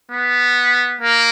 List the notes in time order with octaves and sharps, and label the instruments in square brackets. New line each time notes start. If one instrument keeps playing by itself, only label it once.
[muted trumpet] B3
A#3